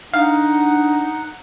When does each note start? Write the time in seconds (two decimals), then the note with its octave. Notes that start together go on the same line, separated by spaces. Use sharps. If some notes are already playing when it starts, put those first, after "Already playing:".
0.14 D4 D#4 F5 F#5